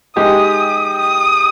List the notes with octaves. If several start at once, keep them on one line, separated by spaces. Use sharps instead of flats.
G#3 D#4 G4 D#6
D#6